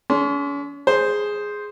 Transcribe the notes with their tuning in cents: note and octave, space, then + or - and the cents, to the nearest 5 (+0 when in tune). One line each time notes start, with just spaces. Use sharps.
C#4 +40 G#4 +35 C6 +0
G#4 +0 C5 +0